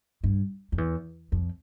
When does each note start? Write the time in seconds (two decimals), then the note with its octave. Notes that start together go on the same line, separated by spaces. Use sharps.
0.24 G2
0.72 F2
0.78 E2
1.32 F2